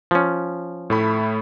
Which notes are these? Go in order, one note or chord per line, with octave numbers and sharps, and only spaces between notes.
F3 C#4
A2 A3 B5